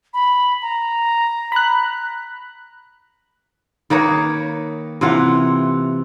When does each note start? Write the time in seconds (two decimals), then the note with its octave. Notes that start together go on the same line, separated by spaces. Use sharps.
0.13 B5
0.62 A#5
1.52 B5 F#6
3.90 D#3 A#3 B4 C#5
5.01 C3 E3 F4 F#5